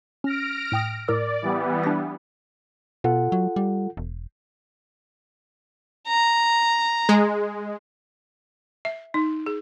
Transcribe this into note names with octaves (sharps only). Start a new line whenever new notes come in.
C#4 F6 A#6 D7
A2 G5 D#6
A2 A#4 D5 E6
E3 G3 B3
D4 A#6
B2 F4 A4 F#5
F#3
G3
E1
A#5
G#3
E5
D#4
G#4